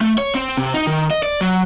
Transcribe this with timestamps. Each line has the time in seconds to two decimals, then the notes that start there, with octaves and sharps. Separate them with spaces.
0.01 A3
0.18 C#5
0.35 C4
0.57 C3
0.74 D#4
0.87 D#3
1.11 D#5
1.23 D5
1.41 F#3